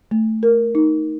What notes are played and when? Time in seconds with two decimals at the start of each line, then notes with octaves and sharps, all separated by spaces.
0.11 A3
0.43 A#4
0.75 D#4